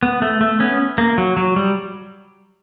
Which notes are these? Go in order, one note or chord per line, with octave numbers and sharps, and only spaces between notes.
B3
A3
A3
B3 C#4
A#3
F#3
F#3
G3